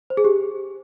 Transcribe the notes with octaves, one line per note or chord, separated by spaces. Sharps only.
C5
G#4
G4